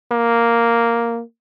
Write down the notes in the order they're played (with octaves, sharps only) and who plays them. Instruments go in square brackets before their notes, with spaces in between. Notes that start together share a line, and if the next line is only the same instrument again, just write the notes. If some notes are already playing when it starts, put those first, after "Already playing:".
[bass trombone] A#3